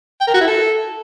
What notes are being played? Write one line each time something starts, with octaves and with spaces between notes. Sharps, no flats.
G5
A#4
F#4
E4
A4